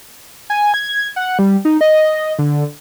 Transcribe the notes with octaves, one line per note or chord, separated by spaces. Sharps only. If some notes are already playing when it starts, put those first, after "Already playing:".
G#5
G#6
F#5
G3
D#4
D#5
D3